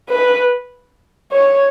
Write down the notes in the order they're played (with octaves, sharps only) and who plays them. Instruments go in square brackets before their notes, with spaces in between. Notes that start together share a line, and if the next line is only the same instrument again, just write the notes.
[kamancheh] B4
C#5